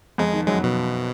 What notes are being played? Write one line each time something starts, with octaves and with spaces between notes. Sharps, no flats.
F2 F3 G#3
D#3
F#2 F#3 G#3
B2